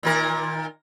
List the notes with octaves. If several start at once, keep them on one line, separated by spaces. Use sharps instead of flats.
A#2 D#3 A#4